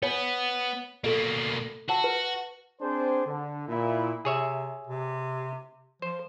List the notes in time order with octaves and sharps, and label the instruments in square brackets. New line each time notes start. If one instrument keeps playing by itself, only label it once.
[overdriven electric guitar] B3 [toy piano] C#5 G#5
[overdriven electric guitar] B2 A#3 [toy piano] A4 D#5
[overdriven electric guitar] F#4 [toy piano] F#5 A5
[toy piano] B4
[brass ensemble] C4 D4 G#4 C5
D3
A#2 E4
[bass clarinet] C3 [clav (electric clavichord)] G#4 C#5 E5
[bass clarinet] C3
[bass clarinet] F3 [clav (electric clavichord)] C5